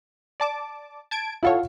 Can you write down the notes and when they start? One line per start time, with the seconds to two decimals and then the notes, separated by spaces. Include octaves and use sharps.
0.40 D5 A5 D6
1.11 A5 G#6 D7
1.43 E4 F4 A4 C#5 F5 F#5